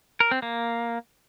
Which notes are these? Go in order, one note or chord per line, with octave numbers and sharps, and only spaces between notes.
A#4
C4
A#3